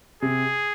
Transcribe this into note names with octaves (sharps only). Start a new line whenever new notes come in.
C3 G#4